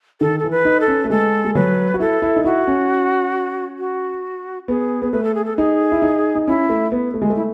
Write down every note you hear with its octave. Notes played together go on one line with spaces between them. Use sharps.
D#3 A4
E3 A4
B4
D#4
A4
C#4
A3
G#3 A4
G#3
F#3 B4
F#4
E4 A4
E4
D#4
E4 F#4
C#4
F#4
B3 G#4
B3
A3 B4
A4
G#4
A4
D#4 G#4
E4
D#4
D#4
C#4 E4
A3
B3
A3
G#3
A3
E4